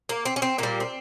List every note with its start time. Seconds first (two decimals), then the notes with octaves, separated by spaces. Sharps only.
0.09 A#3
0.25 C4
0.36 C#4
0.42 C4
0.58 A#2 G3 A#3
0.80 C4